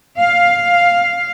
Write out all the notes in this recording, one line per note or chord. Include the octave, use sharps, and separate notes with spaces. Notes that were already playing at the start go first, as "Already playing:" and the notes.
F5